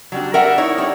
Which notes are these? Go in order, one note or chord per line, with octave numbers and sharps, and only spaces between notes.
F#3 G3 D4
G3 A#4 E5 F#5
D#4 E4 C#5
G3 D4 C#5